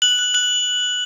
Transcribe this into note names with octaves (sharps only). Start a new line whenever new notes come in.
F#6 F#7
F#6
F#6 F#7